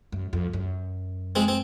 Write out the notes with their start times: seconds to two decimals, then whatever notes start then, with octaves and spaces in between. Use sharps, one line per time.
0.12 F#2
0.33 F2
0.53 F#2
1.36 G#3 C4
1.48 C4